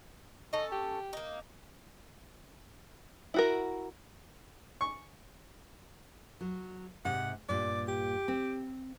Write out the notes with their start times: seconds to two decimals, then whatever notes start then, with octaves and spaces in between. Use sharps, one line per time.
0.53 C#4 A4 D#5
0.72 G4
1.13 A#3 D#4
3.34 E4 F#4 A#4
4.81 C#6
6.41 F#3
7.05 G#2 C3 F#5
7.49 G2 A#2 D5
7.88 G4
8.28 C4